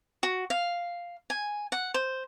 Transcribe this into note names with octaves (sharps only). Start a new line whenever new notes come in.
F#4
F5
G#5
F#5
C5